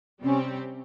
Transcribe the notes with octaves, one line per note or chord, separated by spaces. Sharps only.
C3 G3 C4 C#4 G4